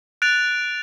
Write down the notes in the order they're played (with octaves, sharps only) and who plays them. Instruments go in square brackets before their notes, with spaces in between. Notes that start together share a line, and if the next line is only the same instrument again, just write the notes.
[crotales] F#6 A6 D7 F7